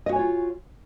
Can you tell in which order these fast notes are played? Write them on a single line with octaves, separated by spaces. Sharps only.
D#5 F#4 G#5 C#5 F4